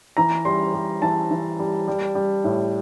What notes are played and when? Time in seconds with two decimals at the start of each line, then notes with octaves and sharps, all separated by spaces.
0.17 E3 A#5
0.45 G3 C6
0.74 G3
1.02 E3 A5
1.31 E3
1.59 G3
1.88 G3
2.15 G3
2.44 A2